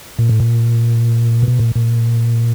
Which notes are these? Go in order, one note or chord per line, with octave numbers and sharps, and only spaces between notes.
A#2
A2
A#2
B2
A#2
A#2